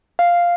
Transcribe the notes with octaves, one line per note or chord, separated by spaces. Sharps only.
F5